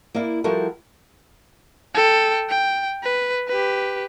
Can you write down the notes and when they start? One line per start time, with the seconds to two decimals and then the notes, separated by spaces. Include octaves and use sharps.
0.14 A#3 E4 D5 F5
0.44 F3 G3 E4 F#4 A4 A#4
1.95 A4 G5
2.49 G5
3.03 B4
3.48 G4 B4